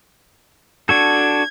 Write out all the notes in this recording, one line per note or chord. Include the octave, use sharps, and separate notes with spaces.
D4 F#4 A4 G#6